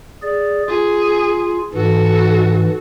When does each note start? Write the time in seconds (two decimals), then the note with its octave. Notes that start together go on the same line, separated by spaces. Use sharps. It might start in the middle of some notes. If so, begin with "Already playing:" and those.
0.23 G#4 D5
0.69 F4 G#4
1.74 G#2 E3 F#4 A4